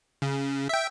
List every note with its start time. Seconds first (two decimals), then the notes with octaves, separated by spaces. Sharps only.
0.22 C#3
0.69 E5 G5